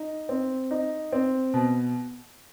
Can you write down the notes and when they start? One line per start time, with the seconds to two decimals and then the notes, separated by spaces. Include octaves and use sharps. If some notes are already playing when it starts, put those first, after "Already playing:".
Already playing: D#4
0.29 C4
0.71 D#4
1.13 C4
1.54 B2